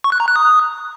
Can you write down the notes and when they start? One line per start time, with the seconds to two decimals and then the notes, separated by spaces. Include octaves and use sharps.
0.04 C#6
0.12 F#6
0.20 A#5
0.28 F#6
0.36 D#6